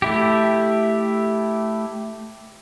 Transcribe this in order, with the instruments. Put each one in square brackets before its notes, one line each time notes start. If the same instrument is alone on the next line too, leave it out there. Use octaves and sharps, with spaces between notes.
[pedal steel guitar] A3 E4 G4